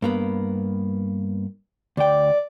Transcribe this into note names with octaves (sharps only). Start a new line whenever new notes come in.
G2 A#3 B3
D2 D5 G5